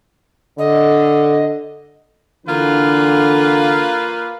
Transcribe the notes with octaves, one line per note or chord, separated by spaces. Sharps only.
D3 D#5
D3 E3 A#3 F4 B4